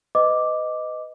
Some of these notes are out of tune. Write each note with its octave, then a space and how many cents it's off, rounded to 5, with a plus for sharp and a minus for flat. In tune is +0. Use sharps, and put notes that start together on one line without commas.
B4 +25 D#5 +0 D6 +0